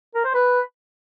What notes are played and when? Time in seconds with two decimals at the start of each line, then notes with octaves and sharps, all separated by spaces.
0.15 A#4
0.24 C5
0.34 B4